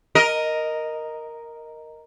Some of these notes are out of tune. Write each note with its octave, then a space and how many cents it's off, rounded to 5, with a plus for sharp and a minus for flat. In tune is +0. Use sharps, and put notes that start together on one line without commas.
A#4 +0 D#5 +0